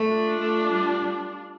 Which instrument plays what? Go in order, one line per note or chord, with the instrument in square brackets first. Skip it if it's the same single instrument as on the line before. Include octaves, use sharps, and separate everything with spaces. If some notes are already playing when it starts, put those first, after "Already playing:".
Already playing: [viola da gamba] A3
[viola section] D4 F4
[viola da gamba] A3
G3